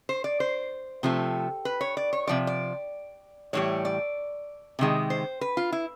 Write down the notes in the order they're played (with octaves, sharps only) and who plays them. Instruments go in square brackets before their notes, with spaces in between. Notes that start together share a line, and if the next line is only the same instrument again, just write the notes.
[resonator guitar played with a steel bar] C5
D5
C5
C3 F3 A3
B4
C#5
D5
C#5
C3 F3 D5
D5
A2 E3 G3 C#5
D5
C3 D#3 G#3
C5
B4
F4
E4